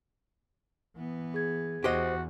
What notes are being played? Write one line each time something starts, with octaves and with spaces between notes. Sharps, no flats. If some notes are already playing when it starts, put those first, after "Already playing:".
E3 B3
G#4 G#6
E2 F#4 G4 C5 D#5